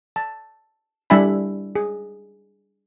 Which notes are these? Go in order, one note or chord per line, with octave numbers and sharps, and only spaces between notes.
A5
G3 D4 E4 E5 G#5 B5
G#4